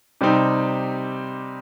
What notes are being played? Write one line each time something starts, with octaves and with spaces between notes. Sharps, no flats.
C3 G3 C4 D#4